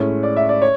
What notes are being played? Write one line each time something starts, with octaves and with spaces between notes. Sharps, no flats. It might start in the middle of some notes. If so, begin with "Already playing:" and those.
Already playing: A2 G#3 C#4
D5
E5
D5
C#5